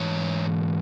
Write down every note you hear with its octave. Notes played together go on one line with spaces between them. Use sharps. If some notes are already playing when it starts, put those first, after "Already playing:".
Already playing: G#2 E3 C#5